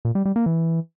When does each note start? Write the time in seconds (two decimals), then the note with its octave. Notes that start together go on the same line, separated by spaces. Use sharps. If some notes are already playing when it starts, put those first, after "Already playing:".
0.05 A#2
0.15 G3
0.25 G3
0.36 A#3
0.46 E3